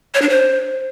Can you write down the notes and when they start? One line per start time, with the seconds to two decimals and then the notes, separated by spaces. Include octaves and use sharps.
0.14 C#5
0.22 D4
0.29 C5